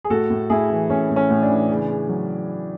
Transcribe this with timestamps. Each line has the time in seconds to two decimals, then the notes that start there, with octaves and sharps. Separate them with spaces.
0.05 G#4
0.10 A2 F#4 A4
0.30 A2
0.50 A2 E4 G#4
0.70 E3
0.90 A2 C#4
1.10 A2
1.16 C#4
1.30 A2
1.43 D4
1.49 E3
1.69 C#3
1.89 C#3
2.09 F#3